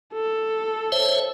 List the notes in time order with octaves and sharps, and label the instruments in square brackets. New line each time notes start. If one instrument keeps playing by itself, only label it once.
[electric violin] A4
[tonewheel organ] C5 C#5 E5